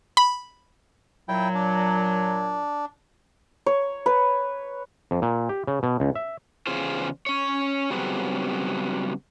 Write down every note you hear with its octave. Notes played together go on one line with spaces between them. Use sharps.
B5
A#2 F#3 E4 G5
D4
C#5
B4
F2
A#2
G4
C#3
B2
C#2
E5
E2 C#3 F4 G#4 C5
C#4 C#5
C#3 F#3 G3 B3 C4